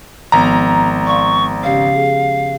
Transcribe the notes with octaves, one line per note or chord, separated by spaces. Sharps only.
G#1 F3 G#3 B3 A#5
D5 F5 C6 C#6
C#3 C#4 G4 F5
G#4